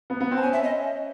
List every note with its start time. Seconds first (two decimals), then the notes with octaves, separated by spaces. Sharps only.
0.10 B3
0.21 B3
0.31 C4
0.37 A5
0.42 C#4 G#5
0.53 E5
0.63 D#5